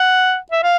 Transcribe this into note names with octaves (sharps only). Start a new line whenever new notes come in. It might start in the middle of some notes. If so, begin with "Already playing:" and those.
Already playing: F#5
E5
F5